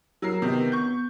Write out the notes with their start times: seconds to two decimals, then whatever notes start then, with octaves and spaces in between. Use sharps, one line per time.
0.22 F#3 A#4 E6 C7
0.42 C3 D#3 B3
0.72 C#6 G6